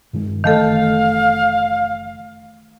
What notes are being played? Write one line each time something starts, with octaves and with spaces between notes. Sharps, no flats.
G2 D#3 G#3
F#1 D#3 E3 A3 A4 F5